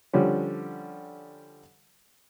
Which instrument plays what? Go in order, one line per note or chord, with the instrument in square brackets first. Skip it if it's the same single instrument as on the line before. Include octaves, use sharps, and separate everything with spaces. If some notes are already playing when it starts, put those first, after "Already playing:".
[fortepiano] D3 F3 G3 C#4